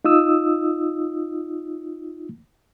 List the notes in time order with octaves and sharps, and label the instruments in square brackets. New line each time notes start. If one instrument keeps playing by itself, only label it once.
[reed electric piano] D#4 F4 D#6 E6